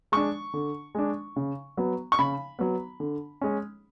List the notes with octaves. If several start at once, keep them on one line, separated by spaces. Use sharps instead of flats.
G#3 D4 C#6
D3
G#3 D4
C#3
F#3 B3
C#6
C#3 B5
F#3 B3
D3
G#3 C#4